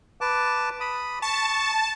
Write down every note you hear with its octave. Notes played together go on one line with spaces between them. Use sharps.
B4 A5 D6
B5 D#6
A5 C#6